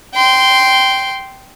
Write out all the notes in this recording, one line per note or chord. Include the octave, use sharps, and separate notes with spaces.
G5 C6